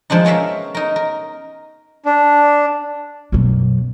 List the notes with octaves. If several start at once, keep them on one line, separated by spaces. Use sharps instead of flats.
F3 G#3 D4 D#4
B3 C#4 A#4 E5 F5
D#4 A#4
A#4
D4
F#2 B2